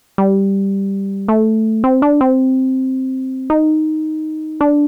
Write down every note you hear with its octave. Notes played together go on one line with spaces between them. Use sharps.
G3
A3
C4
D4
C4
D#4
D4